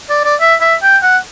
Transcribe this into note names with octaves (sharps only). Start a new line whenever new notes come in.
D5
D5
E5
E5
G5
F#5